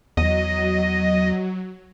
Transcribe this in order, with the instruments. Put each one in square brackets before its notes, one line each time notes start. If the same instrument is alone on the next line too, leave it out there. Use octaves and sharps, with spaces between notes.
[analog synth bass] E2 [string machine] F#3 [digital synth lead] D#5